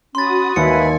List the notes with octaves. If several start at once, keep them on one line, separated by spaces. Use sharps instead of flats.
C#4 F#4 B5 C6 D#6 A6
D#2 B4 E5 G#5 B5 C#7